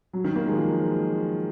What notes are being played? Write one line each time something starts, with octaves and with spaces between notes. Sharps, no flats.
F#3
D#3
A#3
G#3
F3